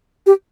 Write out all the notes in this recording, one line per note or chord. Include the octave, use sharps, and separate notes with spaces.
G4